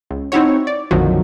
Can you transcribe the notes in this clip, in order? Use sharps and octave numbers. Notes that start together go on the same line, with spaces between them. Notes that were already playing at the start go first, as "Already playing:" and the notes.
C#2
C4 D#4 E4 F#4 C#5
D5
A#1 F2 D3 D#3 F3 F#3